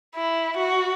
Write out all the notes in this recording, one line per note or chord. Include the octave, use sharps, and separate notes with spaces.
E4
F#4